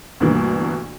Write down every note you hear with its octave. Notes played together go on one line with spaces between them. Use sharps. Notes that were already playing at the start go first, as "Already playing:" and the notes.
D2 G2 B2 E3 A#3